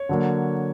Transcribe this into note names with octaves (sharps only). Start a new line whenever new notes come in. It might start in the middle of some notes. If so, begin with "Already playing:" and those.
Already playing: C#5
D3 F#3 A#3